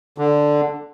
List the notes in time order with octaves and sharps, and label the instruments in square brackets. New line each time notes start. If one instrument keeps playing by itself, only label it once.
[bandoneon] D3